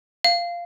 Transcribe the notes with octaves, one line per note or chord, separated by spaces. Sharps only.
F5